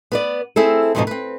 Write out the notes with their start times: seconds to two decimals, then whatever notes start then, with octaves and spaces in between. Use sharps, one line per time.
0.12 B3 B4 D5
0.56 C4 E4 G#4 A4
0.95 F2 G#2 B2 F3 G3 D#4
1.07 C4 B4